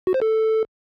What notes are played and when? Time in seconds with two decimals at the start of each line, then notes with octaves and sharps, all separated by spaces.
0.07 F#4
0.14 C5
0.22 A4